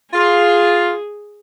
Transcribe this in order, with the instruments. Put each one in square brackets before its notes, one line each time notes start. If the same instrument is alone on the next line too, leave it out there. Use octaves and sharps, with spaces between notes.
[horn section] F4 [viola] G#4